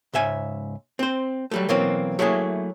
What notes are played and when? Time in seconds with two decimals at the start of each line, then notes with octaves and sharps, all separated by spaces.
0.14 C#2 G#2 E5 G#5
0.99 C4 C5
1.51 F#3 G3 A3
1.69 B2 E3 F#3 A#3 C4
2.19 F#3 A3 A#3 E4 G#4